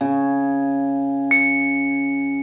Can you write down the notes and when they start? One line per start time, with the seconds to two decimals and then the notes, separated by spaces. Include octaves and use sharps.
0.01 C#3
1.31 C#7